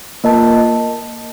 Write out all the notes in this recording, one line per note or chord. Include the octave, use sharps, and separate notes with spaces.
A#3 F4 A#4 D#5 A5